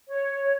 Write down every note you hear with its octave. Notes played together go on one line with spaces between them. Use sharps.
C#5